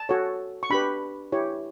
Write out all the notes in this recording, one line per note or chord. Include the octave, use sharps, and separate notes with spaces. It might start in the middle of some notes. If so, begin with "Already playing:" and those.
Already playing: A5
F#4 A4 C#5
C#6
D4 G4 B4 B5
E4 G4 C#5